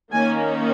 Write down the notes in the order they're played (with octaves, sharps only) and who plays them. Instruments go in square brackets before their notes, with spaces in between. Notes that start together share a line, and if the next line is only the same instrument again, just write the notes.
[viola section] D#3 A#3 C#4 G#5